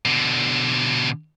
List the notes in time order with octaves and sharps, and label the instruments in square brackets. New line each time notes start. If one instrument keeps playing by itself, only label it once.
[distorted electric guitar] B2 D3